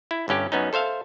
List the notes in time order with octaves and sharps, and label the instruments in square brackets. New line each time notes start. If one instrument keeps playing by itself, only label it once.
[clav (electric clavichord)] E4
G1 G2 C#4 G4
F#2 B3 C#4 D#4
A4 C5 E5 F5